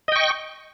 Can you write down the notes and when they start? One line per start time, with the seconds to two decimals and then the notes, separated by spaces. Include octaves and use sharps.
0.08 D#5
0.12 G5
0.16 C#6